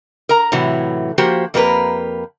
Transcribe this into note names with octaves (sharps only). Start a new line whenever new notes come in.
A#4 A#5
A2 C3 E3 F#3
F3 A#3 F#4 G4 C5
F2 A#3 G4 A#4 B4